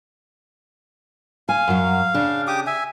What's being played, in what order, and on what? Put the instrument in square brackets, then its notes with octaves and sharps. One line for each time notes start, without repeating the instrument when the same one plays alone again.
[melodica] F5 [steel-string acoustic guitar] G#5
[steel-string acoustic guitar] F#2 F#3
C#3 D4
[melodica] G4 D6 D#6
E5 G#5